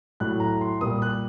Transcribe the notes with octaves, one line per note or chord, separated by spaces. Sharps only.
A2 F#3 A3 F#6
A#5
C6
A#2 G3 A#3 D#6
F#6